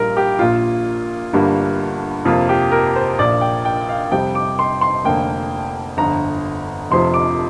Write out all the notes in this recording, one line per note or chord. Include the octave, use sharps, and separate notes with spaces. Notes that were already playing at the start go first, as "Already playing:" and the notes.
Already playing: A#1 A#2 G3 A#4
G4
A#1 A#2 A#3 F4
G1 G2 D3 G3 A#3
F2 C3 A#3 F4
G4
A#4
C5
A#1 A#2 A#3 D5
G5
G5
F5
F2 C3 G3 G5
D6
C6
C6
F1 F2 D3 A#3 G5
G1 F2 D3 A#5
F1 F2 C3 F3 C6
D6